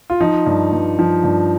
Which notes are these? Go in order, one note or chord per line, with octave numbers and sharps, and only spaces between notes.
F4
F3 D#4
G2
G2
F3
G2